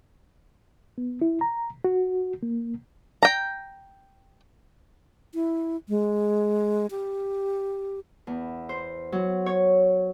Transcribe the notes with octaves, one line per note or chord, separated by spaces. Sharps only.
B3
E4
A#5
F#4
A#3
G5 A#5
E4
G#3
G4
E2
C5
F#3
C#5